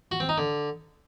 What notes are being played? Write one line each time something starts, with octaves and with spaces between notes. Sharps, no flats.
F#4
C4
D#4
D3